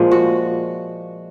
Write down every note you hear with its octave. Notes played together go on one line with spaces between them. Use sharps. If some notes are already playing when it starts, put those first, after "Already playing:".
Already playing: A#2 F3 G#3
F#4